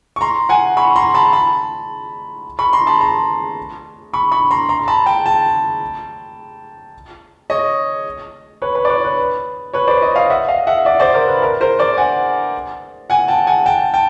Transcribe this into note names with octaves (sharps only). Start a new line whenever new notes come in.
C#6
A#5 C6
F#5 G#5
B5 C#6
A#5 C6
A5 B5
A5 B5
B5 C#6
A#5 C6
A5 B5
A#5 C6
B5 C#6
B5 C#6
A#5 C6
A#5 C6
A#5
A5 B5
G5 A5
G5 A5
C#5 D#5
B4 C#5
B4
D5
B4 C#5
B4
B4 C#5
C5 D5
C#5 D#5
D#5 F5
E5 F#5
D#5 F5
E5 F#5
D5 E5
C5 D5
A#4 C5
B4
A#4
A#4 C5
C5 D5
F#5 G#5
F#5 G#5
G5 A5
F#5 G#5
G5 A5
G5 A5